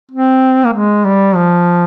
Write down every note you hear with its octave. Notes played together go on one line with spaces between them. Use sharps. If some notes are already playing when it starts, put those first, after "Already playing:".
C4
A#3
G#3
G3
F3